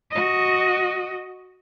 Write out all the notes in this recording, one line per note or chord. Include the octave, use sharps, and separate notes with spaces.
F#4 D#5